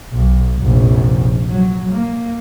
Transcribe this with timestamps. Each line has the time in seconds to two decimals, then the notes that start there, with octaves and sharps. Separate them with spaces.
0.12 B1
0.61 F1 A#1
1.49 F#3
1.91 A#3